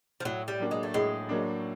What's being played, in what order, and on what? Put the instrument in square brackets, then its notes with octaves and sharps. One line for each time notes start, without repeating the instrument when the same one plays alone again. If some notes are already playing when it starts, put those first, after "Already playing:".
[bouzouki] F3
[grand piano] A2 [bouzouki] F#3
[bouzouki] G3
[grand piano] F#3 A#3 D4
[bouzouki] G#3
A3
[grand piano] A2 [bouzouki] G#3
[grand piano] F#3 A#3 D4